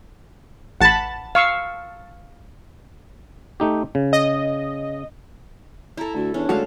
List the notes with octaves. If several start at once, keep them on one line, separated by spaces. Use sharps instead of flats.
A1 F#5 A5 B5 A6
F5 C#6 E6
A3 D#4 G4
C#3
D#5
E4 A4 A#5
D2 F#4
E2 C#4 D4
D3 G#3 A3 F#4 A4 F5